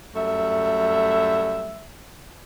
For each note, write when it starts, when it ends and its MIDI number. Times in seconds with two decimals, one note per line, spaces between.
0.16 1.87 42
0.16 1.87 55
0.16 1.87 57
0.16 1.87 76